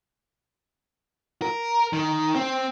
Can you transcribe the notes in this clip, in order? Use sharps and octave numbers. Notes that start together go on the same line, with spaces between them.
A#4
D#3
C4